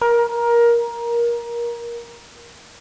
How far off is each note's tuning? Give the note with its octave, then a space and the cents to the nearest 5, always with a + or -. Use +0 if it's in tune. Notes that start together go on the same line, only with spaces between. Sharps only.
A#4 +20